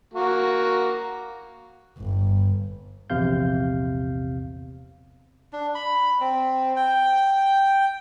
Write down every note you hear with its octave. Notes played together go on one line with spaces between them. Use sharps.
A#3 F#4
G1
A#1 E2 C3 F5 G6
D4
B5
C4
G5